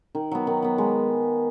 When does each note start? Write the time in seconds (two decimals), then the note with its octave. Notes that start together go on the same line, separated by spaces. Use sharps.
0.15 D#3
0.31 F#3 B3
0.47 D#3
0.62 F#3 B3
0.78 G#3